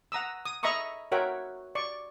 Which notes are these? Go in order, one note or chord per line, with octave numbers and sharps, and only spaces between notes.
F#5 A#5 D#6 E6
D#6
D#5 E5 A#5 B5 C#6 D#6
F#4 A#4 C#5 E5 F#5 G5
D5 C#6